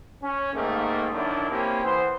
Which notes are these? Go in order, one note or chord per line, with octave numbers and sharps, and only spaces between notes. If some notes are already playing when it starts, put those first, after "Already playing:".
C#4
G#2 D#3 A3 A#3
F#2 D3 D#3 D4 E4
A#3 C4 C#4 E4 G4
E3 B3 C5